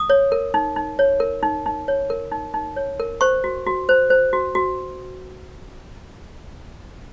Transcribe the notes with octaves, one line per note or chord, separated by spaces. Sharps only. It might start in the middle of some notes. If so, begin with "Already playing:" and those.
Already playing: D#6
C#5
A#4
D#4
D#4
C#5
A#4
D#4
D#4
C#5
A#4
D#4
D#4
C#5
A#4
C5 C#6
F#4
F#4
C5
C5
F#4
F#4